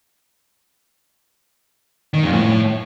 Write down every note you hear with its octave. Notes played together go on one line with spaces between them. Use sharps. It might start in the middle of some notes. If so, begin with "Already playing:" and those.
D#3
F2
A2